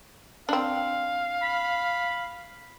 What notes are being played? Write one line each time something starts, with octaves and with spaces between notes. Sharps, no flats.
C4 D4 F5
B5